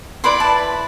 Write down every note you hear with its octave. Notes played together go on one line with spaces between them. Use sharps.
E4 B4 D5 C6
A5